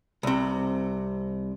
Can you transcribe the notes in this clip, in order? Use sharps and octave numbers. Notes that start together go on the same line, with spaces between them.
C2 C3